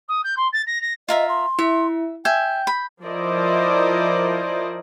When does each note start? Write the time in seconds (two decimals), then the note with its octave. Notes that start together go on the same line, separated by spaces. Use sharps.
0.08 D#6
0.24 G6
0.37 C6
0.53 A6
0.66 A#6
0.81 A#6
1.09 F4 A#4 D#5 E5
1.29 C6
1.59 E4 E5
2.25 E5 G5 G#5 G6
2.67 B5
3.04 F3 E4 A#4 C5 D5 D#5